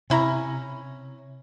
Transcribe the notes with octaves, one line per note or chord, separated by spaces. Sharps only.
C3 C#4 E4 A#5